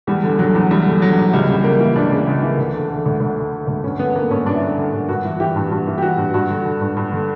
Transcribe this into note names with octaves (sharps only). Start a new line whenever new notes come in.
E2 G3
D3
D3 F#3
E2
E2 G3
D3
D3 F#3
E2
C#2 G3
C#3
C#2 A#3
E3
C#2 D4
C#3
C#2
E3
D2
D3
D3
D2
D2
D3
D3
D2
G2 C#4
D3 B3
D3 A#3
G2 C#4
G2 D4
E4
D3 D4
D3
G2
G2 F#4
E3
E3 G4
G2
G2 F#4
E3
G4
E3 F#4
G2
G2 F#4
D3
D3
G2
G2
D3